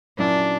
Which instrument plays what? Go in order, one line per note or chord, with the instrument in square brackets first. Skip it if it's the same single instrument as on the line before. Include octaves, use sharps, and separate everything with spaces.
[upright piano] A#2 F#3 C#4 E4 [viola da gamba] D4